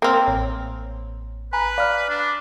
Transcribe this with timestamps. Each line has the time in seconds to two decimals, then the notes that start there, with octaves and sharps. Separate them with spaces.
0.02 A#3 C4 G5 F6
0.27 A1 C#5
1.53 B4 G#5 A#5 B5
1.78 D5 F5 F6
2.09 D4